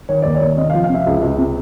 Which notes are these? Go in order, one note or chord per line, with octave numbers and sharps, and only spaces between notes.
D#3 C#5
D#2 D5
C#5
D#2
C3 D#5
F5
F3
F5
C3 E5
C#2
C#2
C3